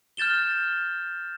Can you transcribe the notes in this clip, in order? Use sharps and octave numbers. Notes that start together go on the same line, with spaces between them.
F6 G6 A6 E7 G7